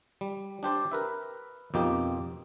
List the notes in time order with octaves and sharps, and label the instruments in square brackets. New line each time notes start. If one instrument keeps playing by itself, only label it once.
[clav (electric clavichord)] G3
D4 G4 C5 D5
A#4 B4 E5
F2 B2 A#3 D#4 G4